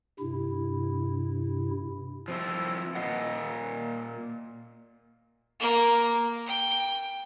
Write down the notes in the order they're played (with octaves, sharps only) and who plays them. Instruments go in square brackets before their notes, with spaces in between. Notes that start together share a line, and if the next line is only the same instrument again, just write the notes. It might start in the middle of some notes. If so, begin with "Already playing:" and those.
[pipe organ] G2 C3 E4
[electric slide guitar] F3 C4 E4
A#2 D#5 F#5
[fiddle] A#3
G5